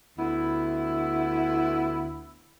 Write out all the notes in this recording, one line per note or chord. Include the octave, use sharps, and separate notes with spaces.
D2 B3 E4